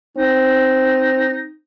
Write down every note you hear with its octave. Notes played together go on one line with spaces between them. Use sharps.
C4 D#4